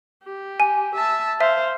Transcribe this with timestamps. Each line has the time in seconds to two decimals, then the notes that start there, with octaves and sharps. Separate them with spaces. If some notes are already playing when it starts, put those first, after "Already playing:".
0.24 G4
0.60 G#5
0.96 E5 A5
1.41 C5 E5 F5